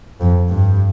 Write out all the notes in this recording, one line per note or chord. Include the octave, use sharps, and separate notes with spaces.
F2
G2